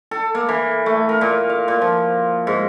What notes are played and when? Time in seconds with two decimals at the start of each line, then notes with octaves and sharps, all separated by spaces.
0.11 A4
0.35 A#3
0.49 E3
0.86 A3
1.09 A#4
1.21 A#2
1.50 F5
1.68 A#2
1.81 F3
2.47 G#2